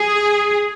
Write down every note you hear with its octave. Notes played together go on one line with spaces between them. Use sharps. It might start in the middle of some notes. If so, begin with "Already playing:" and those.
Already playing: G#4